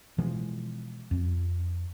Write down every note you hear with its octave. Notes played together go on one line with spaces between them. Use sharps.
B2 E3 F3 G#3
F2